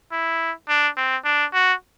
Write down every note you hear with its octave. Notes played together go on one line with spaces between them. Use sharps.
E4
D4
C4
D4
F#4